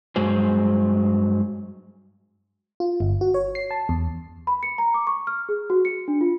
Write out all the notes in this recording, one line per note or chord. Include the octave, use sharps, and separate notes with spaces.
G2 F#3 G#3 G#4 C5
F4
G1
F#4
C#5
C7
A5
E2
B5
C#7
A#5
D6
C#6
F6
G#4
F#4
C#7
D4
F4